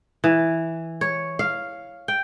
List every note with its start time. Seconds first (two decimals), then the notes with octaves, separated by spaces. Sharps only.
0.24 E3
1.01 C#5
1.39 F5
2.08 G5